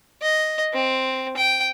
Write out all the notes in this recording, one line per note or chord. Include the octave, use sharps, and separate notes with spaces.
D#5
C4
G5